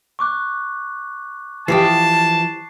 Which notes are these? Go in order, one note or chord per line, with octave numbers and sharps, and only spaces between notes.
C#6 D6 F#6
E3 F3 G4 A5 C7